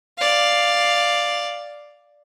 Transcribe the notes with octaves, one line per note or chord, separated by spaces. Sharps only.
D5 F5